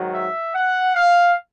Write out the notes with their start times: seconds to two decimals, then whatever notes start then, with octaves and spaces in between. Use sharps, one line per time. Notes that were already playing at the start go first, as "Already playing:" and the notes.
Already playing: G#2 D#3 F#3
0.12 E5
0.54 F#5
0.95 F5